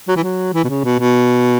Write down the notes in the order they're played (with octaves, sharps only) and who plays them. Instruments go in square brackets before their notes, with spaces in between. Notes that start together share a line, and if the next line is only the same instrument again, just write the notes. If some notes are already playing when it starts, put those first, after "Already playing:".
[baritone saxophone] F#3
E3
F#3
E3
B2
C#3
B2
B2